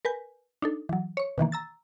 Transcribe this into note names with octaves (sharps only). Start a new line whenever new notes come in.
A#4 B4 G#5 G6
D4 D#4 A4
E3 F#3
C#5 C#6
B2 D#3 E3 A#3
A#5 E6 A6